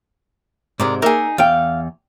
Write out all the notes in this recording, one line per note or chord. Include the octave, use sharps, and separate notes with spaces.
G#2 C3 G#3 A#4 D5
A#3 D#4 G#4 A#4 E5
E2 F5 G5